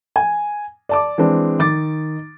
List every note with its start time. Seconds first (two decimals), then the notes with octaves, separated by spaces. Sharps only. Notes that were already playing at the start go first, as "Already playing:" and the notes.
0.16 G#5
0.89 D5 A5 D6
1.18 E3 G#3 C4 D4
1.59 D#3 D6 A6